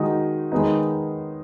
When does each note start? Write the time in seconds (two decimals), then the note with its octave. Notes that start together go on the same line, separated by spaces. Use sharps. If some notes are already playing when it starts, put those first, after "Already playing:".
Already playing: D#3 G#3 D#4 F#4
0.52 D#3 G#3 B3 D#4